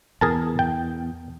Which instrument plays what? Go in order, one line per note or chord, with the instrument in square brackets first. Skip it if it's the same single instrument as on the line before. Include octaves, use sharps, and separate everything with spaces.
[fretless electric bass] E2 [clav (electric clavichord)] G#4 A#4 A5
[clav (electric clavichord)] G5